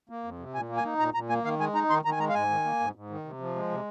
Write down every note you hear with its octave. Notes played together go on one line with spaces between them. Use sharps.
A#3
F2
C3
A#2 G#5
A#3
G#5
D#4
A#2 A#5
A#2 A#5
A#3 G#5
D#3 F5
G#3 G#5
D#4 A#5
D#3 C6
D#3 A#5
G#5
G#3 A#5
F5
G#2 G#5
D#3
A#3
G#2
G#2
D#3
C3
F3
G#3
C3